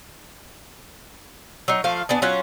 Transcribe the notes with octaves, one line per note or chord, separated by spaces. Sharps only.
F#3 D#4
F3 A3 F5
B3 D4 G#4
F#3 C#4 F4 F#5